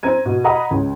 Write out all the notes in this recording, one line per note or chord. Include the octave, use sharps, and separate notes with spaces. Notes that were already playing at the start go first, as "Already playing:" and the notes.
C4 A#5 G#6 D#7
B2
D#5 F#5 A#5 B5 D#6
C#2